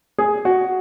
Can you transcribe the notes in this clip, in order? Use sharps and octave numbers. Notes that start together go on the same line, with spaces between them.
G#4
F#4